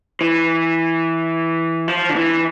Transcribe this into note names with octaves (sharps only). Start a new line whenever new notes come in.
E3
F3
D3
E3